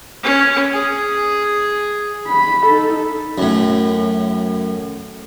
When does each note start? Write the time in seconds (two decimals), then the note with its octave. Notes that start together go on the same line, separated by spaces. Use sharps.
0.23 C#4
0.73 G#4
2.28 B5
2.66 D#4 A4
3.38 F#2 A2